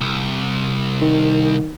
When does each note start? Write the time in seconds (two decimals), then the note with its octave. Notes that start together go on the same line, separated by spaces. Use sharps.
0.01 C2
1.02 D#3